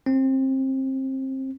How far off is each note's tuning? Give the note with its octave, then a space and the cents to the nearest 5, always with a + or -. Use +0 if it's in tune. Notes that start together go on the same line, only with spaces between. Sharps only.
C4 +25